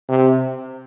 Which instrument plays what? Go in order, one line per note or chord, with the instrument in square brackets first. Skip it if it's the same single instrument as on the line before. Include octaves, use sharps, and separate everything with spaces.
[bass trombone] C3